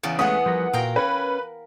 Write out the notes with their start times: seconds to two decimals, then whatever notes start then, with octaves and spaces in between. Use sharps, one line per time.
0.03 E2 C#3 D5
0.19 G#3 A3 B3 C#4 G#4 F#5 D#6
0.46 F3 G3 A#4
0.73 A#2 F#4 A#4 F5 G5
0.96 C#4 B4 C#5